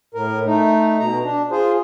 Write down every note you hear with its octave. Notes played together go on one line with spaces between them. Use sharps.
A2 A#4
A3 D#4
B2 A#5
D4
F4 G#4 C5